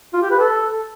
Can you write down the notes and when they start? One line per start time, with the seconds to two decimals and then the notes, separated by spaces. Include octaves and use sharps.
0.13 F4
0.22 G4
0.31 B4
0.40 A4